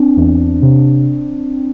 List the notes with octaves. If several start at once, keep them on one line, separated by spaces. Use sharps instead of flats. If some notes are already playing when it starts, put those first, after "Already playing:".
Already playing: C4 D4
E2
C3